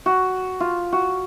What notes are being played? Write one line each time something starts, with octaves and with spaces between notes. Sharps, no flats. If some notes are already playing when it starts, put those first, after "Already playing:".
F#4
F4
F#4